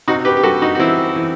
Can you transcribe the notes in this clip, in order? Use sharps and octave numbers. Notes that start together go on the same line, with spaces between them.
C3 D#4 F#4
G4 B4
G4
G3 F#4 A4
D#4 F#4
F#4
E3 C4 E4
E3